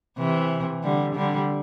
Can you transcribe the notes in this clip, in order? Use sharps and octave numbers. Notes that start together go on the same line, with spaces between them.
C3 E3
D3 G3
D3 G3